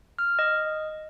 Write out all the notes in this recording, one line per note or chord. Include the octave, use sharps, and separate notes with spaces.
F6
D#5